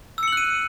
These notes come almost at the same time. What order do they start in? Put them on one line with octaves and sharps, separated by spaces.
E6 C#7 F#7 F#6 D#7